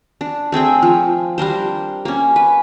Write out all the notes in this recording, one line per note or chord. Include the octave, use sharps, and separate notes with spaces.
D4
A3 C4 G#4 G5
F3
G3 D4 A#4 C5
A#3 C#4
B4